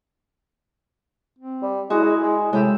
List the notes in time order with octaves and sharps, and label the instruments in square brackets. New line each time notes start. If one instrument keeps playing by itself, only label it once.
[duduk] C4
[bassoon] G3
[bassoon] G#3 [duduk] E4 [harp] F#4
[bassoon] G#3
G#3
[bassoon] A2 [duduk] C3 [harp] G#3 G4 E6